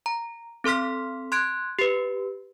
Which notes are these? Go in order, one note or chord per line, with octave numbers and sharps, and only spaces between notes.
A#5
C4 A4 C6 F6 B6
C6 F#6 G#6 D7
G4 B4